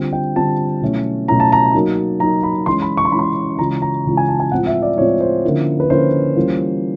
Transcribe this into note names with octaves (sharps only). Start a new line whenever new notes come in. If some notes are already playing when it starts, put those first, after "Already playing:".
Already playing: D3 G3 C4 F4
G5
D3 G3 C4 F4 A5
B2 F#3 A3 C#4 E4
B2 F#3 A3 C#4 E4 A#5
A5
A#5
F#3 A#3 D#4
F#3 A#3 D#4 A#5
B5
E3 G#3 C#4 E4 C6
B5
C#6
C6
E3 G#3 C#4 E4 B5
C6
C#3 E3 G#3 C#4 F4 A#5
A#5
C#3 E3 G#3 C#4 F4
G#5
A5
G#5
A2 F3 G#3 C4 F4 F#5
E5
D5
A2 F3 G#3 C4 F4 C#5
C5
D3 F3 A#3 C#4 E4
B4
D3 F3 A#3 C#4 E4 C5
E3 G3 A#3 C#4 F4